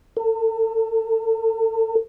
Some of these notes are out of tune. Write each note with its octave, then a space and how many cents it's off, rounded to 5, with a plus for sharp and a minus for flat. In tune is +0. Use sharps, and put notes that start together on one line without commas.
A4 +35